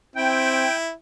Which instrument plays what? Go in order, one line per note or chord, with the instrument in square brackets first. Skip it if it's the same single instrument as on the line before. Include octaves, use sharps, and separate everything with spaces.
[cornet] C4 [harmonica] E4 [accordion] G5